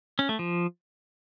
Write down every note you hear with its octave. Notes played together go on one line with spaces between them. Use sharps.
C#4
A3
F3